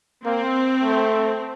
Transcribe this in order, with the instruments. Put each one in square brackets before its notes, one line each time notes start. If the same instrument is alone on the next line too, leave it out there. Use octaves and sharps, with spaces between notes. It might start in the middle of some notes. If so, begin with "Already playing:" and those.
[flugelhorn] A#3 [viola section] C4
[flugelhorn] A3